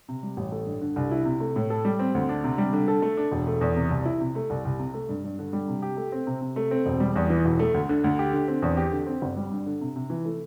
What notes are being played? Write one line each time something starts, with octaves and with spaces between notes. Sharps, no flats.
C3
G3
A1
A3
G2
D3
C2
E4
C3
A3
A2
A4
G3
C4
D2
D4
C3
G3
D3
A4
A3
D4
E1
A3
E2
C3
C2
E4
C3
A3
C2
C2
C3
A3
G2
G2
D3
G3
C3
G4
A3
C4
C3
C3
A3
C4
E1
G3
E2
E3
E1
A3
D2
D3
D2
G4
D3
C4
E2
G4
D3
C4
G1
G3
G2
D3
C3
C3
E3
A3